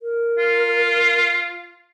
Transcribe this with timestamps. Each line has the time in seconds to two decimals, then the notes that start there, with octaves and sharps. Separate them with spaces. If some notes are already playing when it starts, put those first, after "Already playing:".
0.01 A#4
0.38 F4